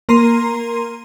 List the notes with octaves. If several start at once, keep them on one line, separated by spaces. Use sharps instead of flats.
A#3 A#4 A#5 C6 C7 D#7